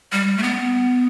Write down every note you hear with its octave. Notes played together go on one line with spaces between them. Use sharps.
G3
A3
B3